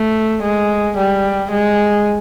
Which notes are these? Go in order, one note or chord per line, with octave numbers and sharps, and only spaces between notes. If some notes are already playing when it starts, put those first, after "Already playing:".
Already playing: A3
G#3
G3
G#3